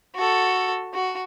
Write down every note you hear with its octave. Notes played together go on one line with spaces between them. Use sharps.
F#4 A4
F#4